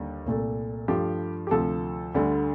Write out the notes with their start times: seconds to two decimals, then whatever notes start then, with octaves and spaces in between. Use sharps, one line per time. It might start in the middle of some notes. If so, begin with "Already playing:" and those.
Already playing: D#2 D3 G3
0.26 C2 A#2 A3
0.88 G2 F3 A3 G4
1.47 G4
1.51 D2 C3 F3 A4
2.14 D2 D3 G3